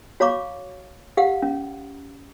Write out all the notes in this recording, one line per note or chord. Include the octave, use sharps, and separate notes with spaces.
F#4 C#5 F5 A#5 C#6 D6
G4 F5 F#5
C#4